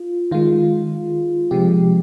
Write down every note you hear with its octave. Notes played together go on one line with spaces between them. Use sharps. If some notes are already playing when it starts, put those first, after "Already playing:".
Already playing: F4
D#3 G#3 F4
C3 F3 G#3 G4